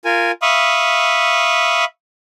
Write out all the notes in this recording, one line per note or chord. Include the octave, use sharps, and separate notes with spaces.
F4 A#4 G#5
E5 F5 B5 C#6 D#6